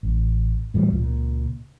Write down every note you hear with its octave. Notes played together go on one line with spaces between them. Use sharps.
A1
A2 E3 F#3 G3
C#2 A#2